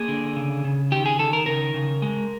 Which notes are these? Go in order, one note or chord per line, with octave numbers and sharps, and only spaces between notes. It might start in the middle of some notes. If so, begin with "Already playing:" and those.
Already playing: A#3 G#4
D3
C#3
C#3
D#3 G4
G#4
D#3 A4
A#4
C#3 A#4
C#3
G#3